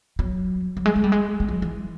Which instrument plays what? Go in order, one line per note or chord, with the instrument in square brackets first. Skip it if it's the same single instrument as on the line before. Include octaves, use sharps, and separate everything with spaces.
[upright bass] F#3
F#3
G#3
G#3
G3
G#3
G3
F#3
E3